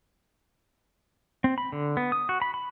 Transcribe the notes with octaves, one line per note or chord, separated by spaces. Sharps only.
C4
B5
D3
B3
D#6
F#4
B5
B5